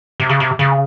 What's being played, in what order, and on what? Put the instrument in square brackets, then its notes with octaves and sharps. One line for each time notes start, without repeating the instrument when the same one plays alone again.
[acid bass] C3
C#3
C3
C#3